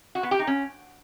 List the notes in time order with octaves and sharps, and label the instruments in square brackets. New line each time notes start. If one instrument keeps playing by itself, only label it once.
[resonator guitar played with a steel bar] F#4
B3
G4
D#4
C#4